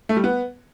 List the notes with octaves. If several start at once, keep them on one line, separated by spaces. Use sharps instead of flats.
A3
G3
B3